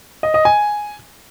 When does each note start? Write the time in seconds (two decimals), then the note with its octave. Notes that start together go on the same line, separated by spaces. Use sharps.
0.23 D#5
0.34 D#5
0.45 G#5